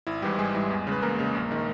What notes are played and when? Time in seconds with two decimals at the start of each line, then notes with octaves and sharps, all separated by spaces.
0.07 G#1 E4
0.22 G#2 E3 G3 G4
0.38 G#1 G#3 G#4
0.55 G#2 E3 G3
0.70 E2
0.87 C#3 G#3 B4
1.02 E2 A#3 A#4
1.19 C#3 G#3
1.35 A#1
1.51 D#3 G#3